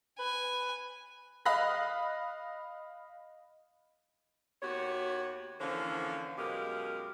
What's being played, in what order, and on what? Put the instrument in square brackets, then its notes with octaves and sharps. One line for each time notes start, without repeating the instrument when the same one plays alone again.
[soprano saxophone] B4 [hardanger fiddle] G#5
[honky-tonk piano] D#5 F5 B5 F#6 A#6
[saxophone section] D#2 B3 F#4 G4 C#5
D3 E3 F3 A#3 C#4 C5
F#2 B2 G#3 G4 A#4 F5